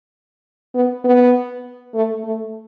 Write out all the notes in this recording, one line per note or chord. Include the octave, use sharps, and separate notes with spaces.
B3
B3
A3
A3